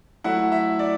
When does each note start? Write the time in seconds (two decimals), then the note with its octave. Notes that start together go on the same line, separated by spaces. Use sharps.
0.24 F#3 A3 E4 F#5
0.52 E5
0.79 D5